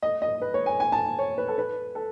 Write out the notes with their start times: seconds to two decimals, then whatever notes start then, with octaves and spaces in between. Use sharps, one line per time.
0.03 D#5
0.22 D#5
0.42 B4
0.54 C#5
0.66 G#5
0.80 G#5
0.92 A5
1.19 C#5
1.38 B4
1.48 A4
1.58 B4
1.95 A4